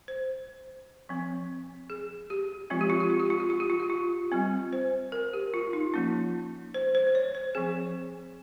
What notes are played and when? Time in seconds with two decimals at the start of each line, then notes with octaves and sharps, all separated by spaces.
0.08 C5
1.09 F3 C4
1.90 G#4
2.30 G4
2.70 F3 G#3 C4 F4
2.81 G4
2.90 F4
3.00 G4
3.10 F4
3.19 G4
3.30 F4
3.40 G4
3.50 F4
3.60 G4
3.70 F4
3.80 G4
3.90 F4
4.32 G3 C4 F4
4.73 C5
5.12 A#4
5.33 G4
5.54 F4
5.73 D#4
5.94 F3 A#3 C#4 F4
6.74 C5
6.95 C5
7.07 C5
7.15 C#5
7.35 C5
7.55 F3 C4 G#4